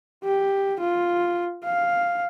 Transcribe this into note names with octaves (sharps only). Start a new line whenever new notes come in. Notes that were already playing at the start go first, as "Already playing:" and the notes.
G4
F4
F5